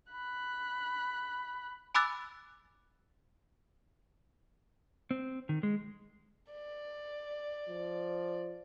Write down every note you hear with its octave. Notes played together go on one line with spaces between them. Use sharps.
B5 F#6
G#5 B5 D6 E6 F#6 A6
C4
D#3
G#3
D5
F3